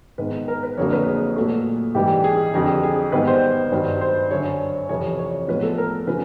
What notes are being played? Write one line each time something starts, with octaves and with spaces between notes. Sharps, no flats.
G#2 D#3 G#3 B3 B4
A#4
B4
F2 D3 F#3 A#3 C#5
B4
G#4
A#2 F#3 A3
G#2 E3 G3 G4
G#4
F2 D3 F#3 G4
G#4
G#2 D#3 G3 B3 B4
C5
G2 D#3 F#3
C5
F#2 D3 F#3 C#5
F2 C3 E3 C#5
C#5
A2 F3 G#3 B3 B4
A4
A#4
C#3 F3 B4